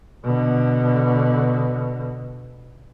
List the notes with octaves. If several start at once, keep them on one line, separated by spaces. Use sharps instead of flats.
B2 D3